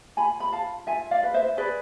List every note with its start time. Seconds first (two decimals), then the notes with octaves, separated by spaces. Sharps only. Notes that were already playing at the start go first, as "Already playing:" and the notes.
0.17 F4 G#5 B5
0.40 B5
0.52 F4 F5 A5
0.87 F4 E5 G#5
1.11 D5 F5
1.23 B4
1.34 C5 E5
1.57 G#4 B4 D5